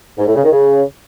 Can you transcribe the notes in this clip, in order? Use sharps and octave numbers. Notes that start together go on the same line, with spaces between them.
G#2
A2
C#3
D#3
C#3